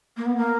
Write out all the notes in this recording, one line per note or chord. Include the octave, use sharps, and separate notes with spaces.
A#3
B3
A#3